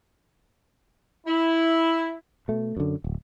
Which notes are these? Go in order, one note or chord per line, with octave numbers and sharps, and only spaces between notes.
E4
B2 A3
F#2 D3
D1